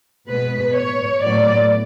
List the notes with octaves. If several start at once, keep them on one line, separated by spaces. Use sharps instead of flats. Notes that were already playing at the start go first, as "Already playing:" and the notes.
B2 G#3 B3 B4
C#5
A2 F#3 B3 D5